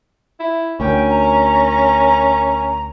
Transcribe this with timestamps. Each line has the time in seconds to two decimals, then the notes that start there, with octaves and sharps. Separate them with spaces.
0.40 E4
0.80 D2 C#4 A#4 G5
1.08 A#5